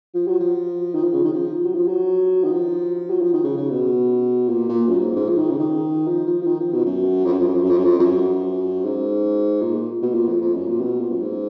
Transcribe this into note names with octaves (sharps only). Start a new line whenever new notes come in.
F3
F#3
F3
D#3
F3
C#3
D#3
F3
F#3
F3
F#3
D#3
F3
F#3
F3
D#3
C#3
C#3
B2
A#2
A#2
F#2
G#2
G#2
F3
D#3
C#3
D#3
F3
F3
F3
D#3
F3
B2
F#2
F2
F#2
F2
F#2
F2
F#2
F2
F#2
F2
F2
F#2
G#2
A#2
A#2
B2
A#2
F2
F2
F#2
A#2
B2
A#2
F#2
G#2